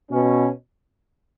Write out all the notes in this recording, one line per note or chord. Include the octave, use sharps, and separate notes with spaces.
B2 C#4